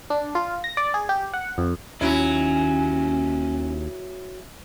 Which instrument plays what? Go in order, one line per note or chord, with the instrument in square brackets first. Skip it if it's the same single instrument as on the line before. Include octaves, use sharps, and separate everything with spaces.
[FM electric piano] D4
F4
A#6
D5
G#4
G4
F#5
F2
[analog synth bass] D#2 [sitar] F#3 E4 [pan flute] C#4